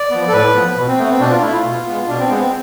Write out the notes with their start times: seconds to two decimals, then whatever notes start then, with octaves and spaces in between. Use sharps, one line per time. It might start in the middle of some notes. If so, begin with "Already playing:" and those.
Already playing: D5
0.11 F3 B3
0.28 A4
0.32 A2 B4
0.55 F3 B3
0.76 B2
0.88 C4
0.98 A3 B3
1.09 C4
1.20 B2 D4
1.31 F4
1.41 A3 E4
1.53 F4
1.64 B2
1.86 G#3 B3
2.08 B2 D4
2.19 C4
2.29 G#3 B3
2.40 C4